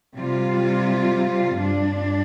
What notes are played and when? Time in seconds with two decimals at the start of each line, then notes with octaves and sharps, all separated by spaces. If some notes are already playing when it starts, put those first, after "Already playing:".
0.15 C3 G3 F4
1.58 G2 G3 D4